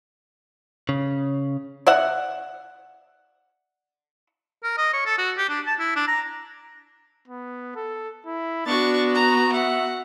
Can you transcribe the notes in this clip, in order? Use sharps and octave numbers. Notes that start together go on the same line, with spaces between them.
C#3
D5 E5 F#5
A#4
D#5
C#5
A4
F#4
G4
D4
A5
E4
D4
A#5
B3
A4
E4
B3 D4 F#4 C#6 A6
A#5
E5 F#5